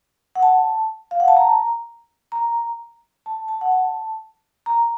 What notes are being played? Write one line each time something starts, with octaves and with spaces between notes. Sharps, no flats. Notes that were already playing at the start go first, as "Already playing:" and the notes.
F#5
A5
F5
F#5
A5
A#5
A#5
A5
A5
F#5
A5
A#5